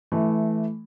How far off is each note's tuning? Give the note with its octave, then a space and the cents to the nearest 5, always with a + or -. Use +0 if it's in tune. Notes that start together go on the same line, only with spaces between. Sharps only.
E3 +0 A3 -15